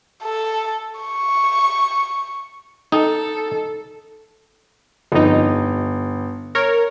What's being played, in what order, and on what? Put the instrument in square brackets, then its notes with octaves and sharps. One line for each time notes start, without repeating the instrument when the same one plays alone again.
[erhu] A4
C#6
[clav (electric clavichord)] D#4 [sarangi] A4
[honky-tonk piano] G1 [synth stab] F2 D#4
[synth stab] A#4 C#5